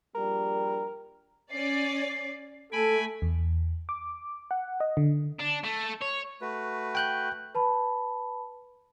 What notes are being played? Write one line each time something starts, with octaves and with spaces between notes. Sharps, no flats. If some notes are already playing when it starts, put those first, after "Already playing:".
A#1 G3 A#4
C#4 D5 C7
A3 A4 G#5 B5 D7
E2
D6
F#5
D#5
D3
D4
A3
C#5
A3 F#4 B4
G5 F#6 G6
B4 A5 B5